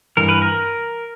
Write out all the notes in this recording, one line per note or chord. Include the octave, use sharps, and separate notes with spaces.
G2 E3 A#4
B4
A#4